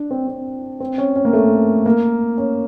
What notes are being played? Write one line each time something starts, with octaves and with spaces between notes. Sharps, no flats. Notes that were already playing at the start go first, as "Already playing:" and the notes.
Already playing: D4
C4
C4
C4
C#4
C#4
A#3
A3
A#3
C#4